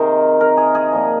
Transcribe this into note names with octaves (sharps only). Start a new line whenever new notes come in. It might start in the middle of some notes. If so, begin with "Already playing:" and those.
Already playing: C3 D#3 G#4 A#4 C5
A#4
G#4
G#4
A#2 F3